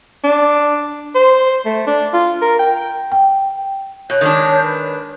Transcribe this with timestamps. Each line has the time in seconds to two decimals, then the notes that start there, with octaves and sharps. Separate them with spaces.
0.24 D4
1.15 C5
1.66 A3
1.87 D4
2.13 F4
2.42 A#4
2.59 G5
3.12 G5
4.10 B2 C#5 G6
4.21 D#3 G#3 D4
4.63 B4